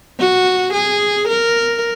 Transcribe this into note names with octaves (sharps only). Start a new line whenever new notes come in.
F#4
G#4
A#4